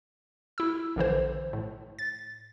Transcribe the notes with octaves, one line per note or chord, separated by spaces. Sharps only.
E4 E6
A#1 D3 E3 C5
A2
A6